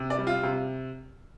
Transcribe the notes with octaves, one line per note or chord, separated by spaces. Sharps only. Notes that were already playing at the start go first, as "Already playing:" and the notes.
Already playing: C3
D5
G3
F4
C3